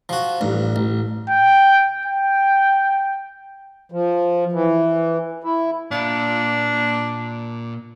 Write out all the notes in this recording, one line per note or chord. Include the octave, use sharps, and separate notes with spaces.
F3 F#4
A1 G2
A1
G5
G5
F3
E3
E4
A#2 D4 F5